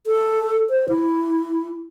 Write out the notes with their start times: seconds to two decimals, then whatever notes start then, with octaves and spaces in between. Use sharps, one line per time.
0.07 A4
0.70 C5
0.89 E4